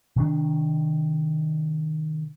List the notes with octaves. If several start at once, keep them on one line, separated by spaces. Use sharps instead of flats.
C3 D#3 D4